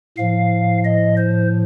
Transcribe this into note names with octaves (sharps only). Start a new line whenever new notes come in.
A2 F3 F5
D#5
C5